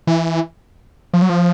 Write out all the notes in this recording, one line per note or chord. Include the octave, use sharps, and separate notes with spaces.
E3
F3
F#3
F3